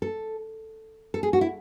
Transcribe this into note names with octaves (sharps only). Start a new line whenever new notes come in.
A4
A4
G#4
F#4
E4